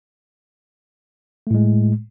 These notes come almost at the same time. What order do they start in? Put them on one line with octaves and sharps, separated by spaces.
A3 A2 G#3